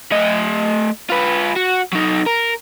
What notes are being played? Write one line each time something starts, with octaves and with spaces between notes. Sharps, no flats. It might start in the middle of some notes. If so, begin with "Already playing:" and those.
A3 D#5
F4 B4
F#4
F#3 D#4
A#4